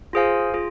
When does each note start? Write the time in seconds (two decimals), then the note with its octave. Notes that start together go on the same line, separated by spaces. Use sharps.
0.13 F4 G#4 C5 F5 G#5
0.54 F4 G#4